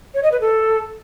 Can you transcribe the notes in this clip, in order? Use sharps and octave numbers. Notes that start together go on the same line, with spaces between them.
C#5
D#5
B4
A4